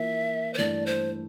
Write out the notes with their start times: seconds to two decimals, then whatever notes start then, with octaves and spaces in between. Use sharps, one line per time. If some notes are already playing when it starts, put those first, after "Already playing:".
Already playing: E3 A#3 F4 E5
0.54 C5
0.58 G2 E3 A3 E4 D5
0.86 C5